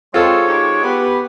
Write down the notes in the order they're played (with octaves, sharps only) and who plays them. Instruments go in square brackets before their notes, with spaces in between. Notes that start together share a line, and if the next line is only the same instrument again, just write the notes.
[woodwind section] G#3 C#5 [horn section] C4 [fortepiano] F4 A4
[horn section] D#4 G4
[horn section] B3 [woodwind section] G4 B4